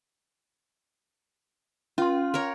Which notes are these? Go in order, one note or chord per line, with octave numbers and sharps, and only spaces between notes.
C#4 F4 C6
A#4 C#5